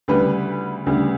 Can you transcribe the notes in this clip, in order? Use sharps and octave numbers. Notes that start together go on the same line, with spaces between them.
D2 C#3 G3 B4
D2 C#3 G3